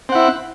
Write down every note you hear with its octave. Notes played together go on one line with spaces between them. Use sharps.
C4 E4 F#5